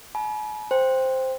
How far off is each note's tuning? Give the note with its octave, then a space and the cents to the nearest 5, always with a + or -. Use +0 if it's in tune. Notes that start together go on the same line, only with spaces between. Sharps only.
G#5 +45 B5 -40
C5 +0 G5 +10